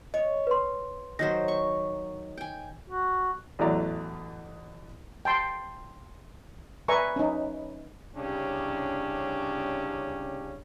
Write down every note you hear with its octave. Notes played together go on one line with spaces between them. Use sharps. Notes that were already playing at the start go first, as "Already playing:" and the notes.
C#5 D#5
B4 C6
D#3 F#3 C5 A#6
C#6
G5 G#5
F#4
A1 E2 F#3 A3 D5 A#5
G5 A5 C6
B4 D5 E5 G#5 A#5 C#6
C#4 D#4
C2 C#3 C#4 D4 G4